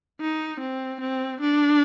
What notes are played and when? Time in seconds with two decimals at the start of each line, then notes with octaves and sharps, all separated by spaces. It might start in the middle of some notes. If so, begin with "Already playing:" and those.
0.21 D#4
0.61 C4
1.01 C4
1.41 D4